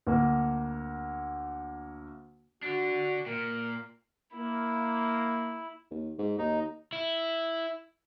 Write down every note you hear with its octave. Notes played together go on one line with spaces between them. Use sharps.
D2 A#3
D3 D4 F#4
A#2 A#4
A#3 E4
D#2
G#2
D#2 D#4
E4